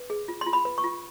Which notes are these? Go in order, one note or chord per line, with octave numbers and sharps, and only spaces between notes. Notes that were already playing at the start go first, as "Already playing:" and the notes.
Already playing: B4
G#4
F4
C6
F4
B5
B4
C#6
F4